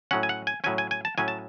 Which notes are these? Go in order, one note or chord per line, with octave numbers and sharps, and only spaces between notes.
A2 F#3 C#4 F#5
G#5
F#5
G#5
A2 F#3 C#4 G#5
G#5
G#5
A5
A2 F#3 C#4 G#5
A5